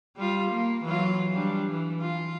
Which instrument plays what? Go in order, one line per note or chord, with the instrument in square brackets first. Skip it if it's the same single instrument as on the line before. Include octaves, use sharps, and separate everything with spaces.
[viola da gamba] G3 F4
A#3
E3 F#3 F4
G3 D4
E3
F4